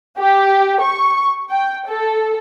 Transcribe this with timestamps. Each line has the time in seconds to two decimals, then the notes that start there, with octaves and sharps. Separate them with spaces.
0.18 G4
0.81 C#6
1.50 G5
1.86 A4